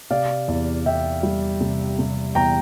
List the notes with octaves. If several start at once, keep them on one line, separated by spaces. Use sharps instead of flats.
C3 D5 F5
E2
E2 E5 G5
G3
C3
C3
E2 G5 A#5